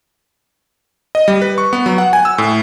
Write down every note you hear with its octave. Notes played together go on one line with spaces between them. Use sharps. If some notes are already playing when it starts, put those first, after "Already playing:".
D#5
G3
B4
C#6
B3
F#3
F#5
G#5
E6
A2